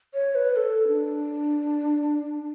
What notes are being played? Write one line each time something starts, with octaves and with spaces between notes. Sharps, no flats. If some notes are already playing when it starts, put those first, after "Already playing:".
C#5
B4
A4
D4